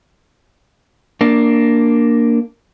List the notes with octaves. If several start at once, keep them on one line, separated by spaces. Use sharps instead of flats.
A#3 D4